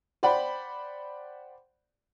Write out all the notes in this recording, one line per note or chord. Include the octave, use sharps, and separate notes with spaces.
C5 D5 F#5 G5 B5